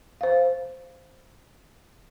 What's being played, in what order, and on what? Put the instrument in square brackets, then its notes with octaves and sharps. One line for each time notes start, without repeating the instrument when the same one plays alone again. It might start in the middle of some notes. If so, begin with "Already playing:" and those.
[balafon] C5 F5